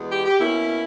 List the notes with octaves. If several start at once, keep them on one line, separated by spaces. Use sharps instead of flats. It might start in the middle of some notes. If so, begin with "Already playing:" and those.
Already playing: E2 B2 G#3 B3
G4
G4
B2 A#3 C#4 E4